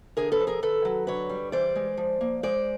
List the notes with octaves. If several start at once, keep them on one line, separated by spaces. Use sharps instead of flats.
D3 G#4 A#4
A4 B4
F3
G#4 A#4
D#3 A4 B4
F#3
D3 B4 C#5
G3
E3 C5 D5
G#3
F3
A#3
G#3 C5 D5